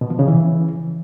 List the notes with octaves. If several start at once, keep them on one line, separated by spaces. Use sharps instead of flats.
B2
F3
C#3
E3